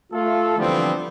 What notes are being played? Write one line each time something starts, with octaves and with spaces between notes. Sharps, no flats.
A3 F4 A4
D3 E3 F3 G3 B3 C4